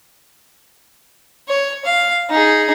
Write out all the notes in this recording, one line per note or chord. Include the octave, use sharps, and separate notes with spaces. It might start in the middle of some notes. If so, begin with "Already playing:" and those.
C#5
F5
D#4 G#4